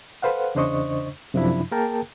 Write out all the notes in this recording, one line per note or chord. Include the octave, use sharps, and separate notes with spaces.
A4 B4 C5 F5 F#5
E2 C#3 D4 C5 D#5 C#6
F#2 C3 F3 D4 E4 B5
A#3 G#4 A#4 G5 A5